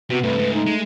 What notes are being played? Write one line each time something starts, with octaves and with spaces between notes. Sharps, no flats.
C3 B3 F#4
G2 C3 A3 B4
G#2 C#3
D#4
G#3